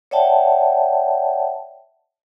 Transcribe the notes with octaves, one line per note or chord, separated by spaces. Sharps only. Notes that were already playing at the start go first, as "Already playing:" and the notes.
C#5 D5 E5 F#5 G5 A5